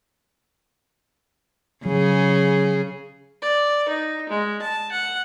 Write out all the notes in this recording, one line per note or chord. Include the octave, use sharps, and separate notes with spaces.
C#3 F#3 G#4
D5
D#4
G#3
A5
F#5